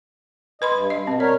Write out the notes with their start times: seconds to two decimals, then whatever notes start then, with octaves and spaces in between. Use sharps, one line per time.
0.62 B4 D#5 B5 C6
0.74 G2
0.90 D#5
1.07 B2 C4
1.20 A#4 C#5 D5